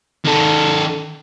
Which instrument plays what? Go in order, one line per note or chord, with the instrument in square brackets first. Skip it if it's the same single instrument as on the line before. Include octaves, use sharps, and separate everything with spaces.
[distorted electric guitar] D#3 A4